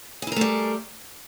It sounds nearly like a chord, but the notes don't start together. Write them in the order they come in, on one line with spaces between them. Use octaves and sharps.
G#4 E4 A#4 A3 G3